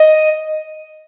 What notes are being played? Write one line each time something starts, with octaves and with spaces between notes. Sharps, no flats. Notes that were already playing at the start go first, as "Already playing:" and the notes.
Already playing: D#5